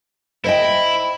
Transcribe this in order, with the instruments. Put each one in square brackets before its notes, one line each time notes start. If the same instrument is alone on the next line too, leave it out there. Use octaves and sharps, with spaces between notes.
[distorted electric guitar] E4 [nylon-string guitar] C5 D#5 G5